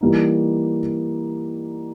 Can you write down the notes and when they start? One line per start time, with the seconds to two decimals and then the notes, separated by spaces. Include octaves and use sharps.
0.01 E3 G3 A#3 D#4